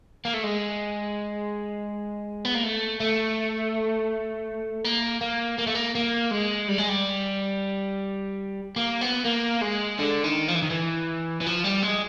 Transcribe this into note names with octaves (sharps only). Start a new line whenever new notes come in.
A#3
A3
G#3
B3
A#3
A3
A3
A#3
A#3
A#3
A3
A#3
A#3
G#3
G3
G#3
G3
A#3
B3
A#3
G#3
D3
D#3
F3
E3
D#3
E3
E3
F3
G3
G#3